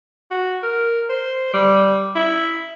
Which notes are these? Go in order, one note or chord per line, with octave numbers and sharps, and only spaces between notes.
F#4
A#4
C5
G3
E4